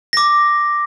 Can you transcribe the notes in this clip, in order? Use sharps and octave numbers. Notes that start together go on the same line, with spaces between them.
D6 A#6